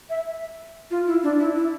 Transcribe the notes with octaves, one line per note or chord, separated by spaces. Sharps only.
E5
F4
E4
D4
E4
E4